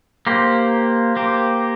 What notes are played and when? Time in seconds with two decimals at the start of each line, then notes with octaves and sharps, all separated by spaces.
0.27 A#3 G4 C5
1.16 A#3 G4 C5